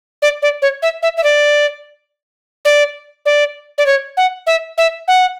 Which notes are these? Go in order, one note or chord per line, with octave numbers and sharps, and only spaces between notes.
D5
D5
C#5
E5
E5
E5
D5
D5
D5
D5
C#5
F#5
E5
E5
F#5